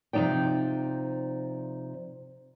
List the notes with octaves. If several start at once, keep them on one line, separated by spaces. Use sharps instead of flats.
C3 F3 F#3 D#4 D5 G5